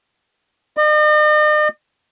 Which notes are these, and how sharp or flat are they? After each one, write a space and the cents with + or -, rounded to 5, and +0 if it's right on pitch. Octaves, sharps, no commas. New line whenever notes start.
D#5 -45